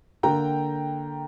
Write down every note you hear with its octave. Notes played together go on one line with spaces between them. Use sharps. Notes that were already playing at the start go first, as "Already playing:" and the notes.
D3 A#3 G5 A#5